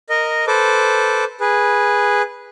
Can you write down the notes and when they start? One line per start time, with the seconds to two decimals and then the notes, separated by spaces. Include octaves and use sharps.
0.10 A#4 D#5
0.47 A4 B4 C5 D6
1.41 G#4 B4